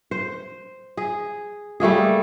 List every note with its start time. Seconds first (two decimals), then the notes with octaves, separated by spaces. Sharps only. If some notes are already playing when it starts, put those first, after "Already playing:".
0.11 C5
0.97 G#4
1.80 G3 A3 A#3 G#4